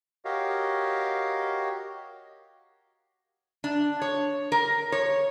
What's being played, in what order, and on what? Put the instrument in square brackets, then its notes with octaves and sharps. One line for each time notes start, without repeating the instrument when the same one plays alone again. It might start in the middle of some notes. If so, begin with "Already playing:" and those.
[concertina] F#4 G4 A#4 C#5 D#5 F5
[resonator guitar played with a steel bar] D4
C#5
A#4
C#5